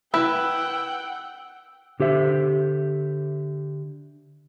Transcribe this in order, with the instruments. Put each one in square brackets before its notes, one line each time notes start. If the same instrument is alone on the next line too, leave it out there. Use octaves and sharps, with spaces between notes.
[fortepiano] E4 [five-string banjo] B4 [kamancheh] F#5 G5 [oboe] E6
[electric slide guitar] D3 G4 C5 E5